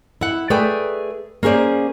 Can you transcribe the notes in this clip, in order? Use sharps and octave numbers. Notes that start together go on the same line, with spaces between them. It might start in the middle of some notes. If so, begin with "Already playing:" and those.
E4 F#5
A3 G#4 B4 D5 G5 G#5
A#3 C#4 G#4 C5 D5